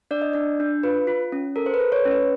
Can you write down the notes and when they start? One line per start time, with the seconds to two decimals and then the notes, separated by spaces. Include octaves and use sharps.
0.11 D4 D5
0.22 D#5
0.33 D4 D5
0.60 D4
0.83 F4 B4
1.07 F4
1.32 C#4
1.56 A4 A#4
1.66 C5
1.74 B4
1.80 A4
1.92 C#5
2.05 C#4
2.11 B4